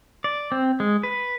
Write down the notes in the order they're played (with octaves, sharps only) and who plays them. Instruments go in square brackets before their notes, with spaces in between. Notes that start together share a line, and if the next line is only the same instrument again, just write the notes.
[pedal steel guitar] D5
C4
G#3
B4